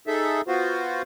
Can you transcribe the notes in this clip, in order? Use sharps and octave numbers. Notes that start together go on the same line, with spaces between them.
D#4 G#4 A4 E5
B3 F4 F#4 C5